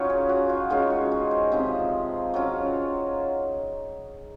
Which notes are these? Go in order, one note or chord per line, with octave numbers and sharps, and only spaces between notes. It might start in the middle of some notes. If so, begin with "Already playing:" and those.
Already playing: F#3 C#4 D#4 F4 C#5
G#4
F#4
F4
D#3 G#3 C#4 F4 F#4
F#4
G#4
C5
C3 F3 C4 D#4
F#3 C#4 F4